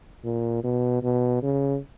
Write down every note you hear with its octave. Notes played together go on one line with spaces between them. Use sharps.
A#2
B2
B2
C#3